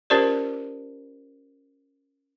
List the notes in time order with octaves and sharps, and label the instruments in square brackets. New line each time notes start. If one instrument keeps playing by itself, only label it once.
[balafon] C#4 F4 G4 A#4 C5 D5